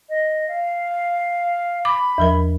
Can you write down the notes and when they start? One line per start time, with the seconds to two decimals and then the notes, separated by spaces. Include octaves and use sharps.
0.09 D#5
0.48 F5
1.85 B5 D6
2.18 E2 F3 A#4